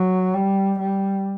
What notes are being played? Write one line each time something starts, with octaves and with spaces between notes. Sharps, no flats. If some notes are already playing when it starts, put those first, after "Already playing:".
Already playing: F#3
G3
G3